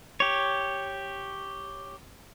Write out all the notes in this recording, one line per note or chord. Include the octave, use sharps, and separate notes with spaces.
G4 C#5